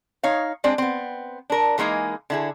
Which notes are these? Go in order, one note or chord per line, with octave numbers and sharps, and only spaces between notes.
D#4 C#5 F5
G#3 C4 D4 D5
B3 C4
D4 A#4
E3 G#3 A#3 D#4 G#4
D3 E4 G#4